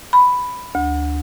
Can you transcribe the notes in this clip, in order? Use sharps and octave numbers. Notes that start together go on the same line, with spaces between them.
B5
D2